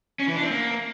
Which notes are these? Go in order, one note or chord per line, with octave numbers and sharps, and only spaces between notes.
C#4
E3
D4
C4
A#3